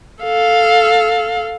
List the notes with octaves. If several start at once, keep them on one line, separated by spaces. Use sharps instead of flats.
A4 F5